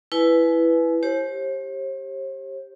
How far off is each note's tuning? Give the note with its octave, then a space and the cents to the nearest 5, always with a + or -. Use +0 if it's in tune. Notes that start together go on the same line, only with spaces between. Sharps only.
E4 +10 B4 +0 G#5 +40
G4 +0 C5 +45